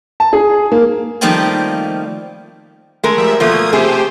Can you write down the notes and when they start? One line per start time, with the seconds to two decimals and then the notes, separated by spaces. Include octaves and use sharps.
0.20 A5
0.33 G#4
0.72 A#3
1.21 D#3 F3 G3 A3 A#3 C4
3.04 G#3 A3 A#4
3.18 F3 G3 E5
3.40 B2 F3 A3 A#3 D#6 G#6
3.73 C3 A3 G4 G#4 C5